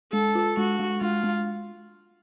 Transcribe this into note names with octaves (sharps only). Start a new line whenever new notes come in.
G#3 A4
F4
G#3 F#4
G#3
G#3 F4
G#3